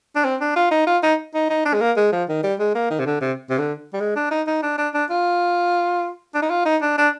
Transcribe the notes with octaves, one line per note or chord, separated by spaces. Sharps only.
D4
C4
D4
F4
D#4
F4
D#4
D#4
D#4
D4
G#3
A#3
G#3
F3
D#3
G3
G#3
A#3
D#3
C3
D3
C3
C3
D3
G3
G#3
D4
D#4
D#4
D4
D4
D4
F4
D4
D#4
F4
D#4
D4
D4